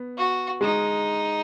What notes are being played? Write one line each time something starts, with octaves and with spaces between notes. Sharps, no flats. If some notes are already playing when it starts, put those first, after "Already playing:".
Already playing: B3
F#4
G#3 D#4